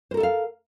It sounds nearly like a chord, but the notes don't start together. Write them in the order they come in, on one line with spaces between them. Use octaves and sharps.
C5 A#4 A4 E5 F5